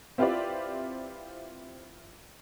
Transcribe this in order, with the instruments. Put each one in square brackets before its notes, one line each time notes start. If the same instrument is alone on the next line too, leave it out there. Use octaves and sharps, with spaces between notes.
[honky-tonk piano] C4 E4 F4 G4 B4 D5